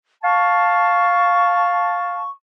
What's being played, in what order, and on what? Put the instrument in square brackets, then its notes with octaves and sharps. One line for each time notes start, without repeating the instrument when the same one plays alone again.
[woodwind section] F5 A5 [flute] C#6